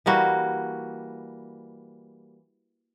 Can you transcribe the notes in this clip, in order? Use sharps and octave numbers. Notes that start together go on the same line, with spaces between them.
E3 G3 A#3 F#4